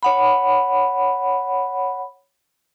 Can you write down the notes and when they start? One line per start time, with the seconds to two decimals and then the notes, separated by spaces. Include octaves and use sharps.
0.03 C#5 F#5 B5